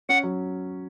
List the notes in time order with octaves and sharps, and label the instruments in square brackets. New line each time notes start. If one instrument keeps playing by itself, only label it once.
[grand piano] C#4 [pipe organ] F#5
[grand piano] F#3